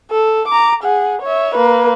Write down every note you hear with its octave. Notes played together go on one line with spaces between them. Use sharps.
A4
A#5 D6
G#4 F#5
C#5 E5
A#3 B4